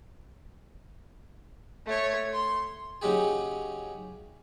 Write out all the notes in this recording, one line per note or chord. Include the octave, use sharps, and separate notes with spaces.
A3 C#5
C6
C#3 F#3 D#4 G4 G#4